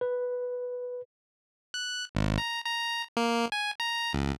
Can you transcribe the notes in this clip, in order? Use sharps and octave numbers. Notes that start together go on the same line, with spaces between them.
B4
F#6
G#1
A#5
A#5
A#3
G#5
A#5
C#2